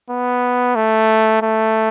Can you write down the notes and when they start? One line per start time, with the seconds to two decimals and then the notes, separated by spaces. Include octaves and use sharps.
0.10 B3
0.76 A3
1.42 A3